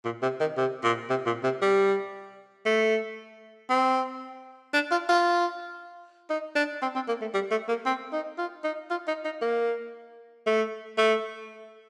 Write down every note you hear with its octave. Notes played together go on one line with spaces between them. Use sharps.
A#2
C3
D#3
C3
A#2
C3
A#2
C3
G3
A3
C4
D4
F4
F4
D#4
D4
C4
C4
A#3
A3
G3
A3
A#3
C4
D#4
F4
D#4
F4
D#4
D#4
A#3
A3
A3